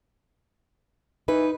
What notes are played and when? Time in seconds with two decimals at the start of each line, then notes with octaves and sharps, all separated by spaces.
1.28 E3 D#4 B4